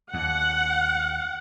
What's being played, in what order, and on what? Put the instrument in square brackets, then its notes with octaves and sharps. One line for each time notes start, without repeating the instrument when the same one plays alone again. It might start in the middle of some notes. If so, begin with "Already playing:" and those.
[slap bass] D#2 [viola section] F#5